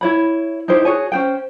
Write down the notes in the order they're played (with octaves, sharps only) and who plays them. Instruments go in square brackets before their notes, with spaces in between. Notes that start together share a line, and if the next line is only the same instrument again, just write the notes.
[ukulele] E4 C#5 B5
D#4 E4 G4 C5
F#4 G#4 C#5 G#5
C#4 C5 G5